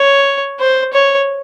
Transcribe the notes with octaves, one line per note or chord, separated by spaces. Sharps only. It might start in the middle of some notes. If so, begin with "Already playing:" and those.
Already playing: C#5
C5
C#5